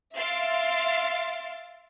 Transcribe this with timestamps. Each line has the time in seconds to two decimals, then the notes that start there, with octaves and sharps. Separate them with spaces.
0.14 E5 F5 C6 A6 D7